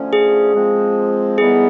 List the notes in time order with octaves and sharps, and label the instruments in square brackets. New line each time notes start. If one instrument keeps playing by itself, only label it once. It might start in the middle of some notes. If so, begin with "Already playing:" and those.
Already playing: [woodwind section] D3 F3 A3 C#4
[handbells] G#4
[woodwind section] F3 G#3 C4
[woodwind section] A2 E3 G3 B3 D#4 [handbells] G#4